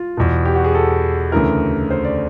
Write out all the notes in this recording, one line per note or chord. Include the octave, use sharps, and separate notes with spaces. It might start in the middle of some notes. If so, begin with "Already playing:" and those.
Already playing: F4
E2 B2
G4
F#4
G#4
A4
D2 C#3 E3 A#4
C5
D5